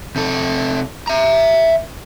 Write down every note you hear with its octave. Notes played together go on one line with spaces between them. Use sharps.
C3 A4
E5 A#5